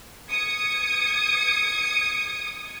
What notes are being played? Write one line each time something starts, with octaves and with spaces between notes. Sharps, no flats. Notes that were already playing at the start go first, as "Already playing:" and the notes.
D#6 G#6 C#7